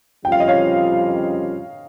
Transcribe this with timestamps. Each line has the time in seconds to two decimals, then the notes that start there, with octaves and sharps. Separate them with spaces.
0.25 F2 C#3 G3 C#4 F4 G5
0.32 F5
0.40 D#5
0.48 C#5 F5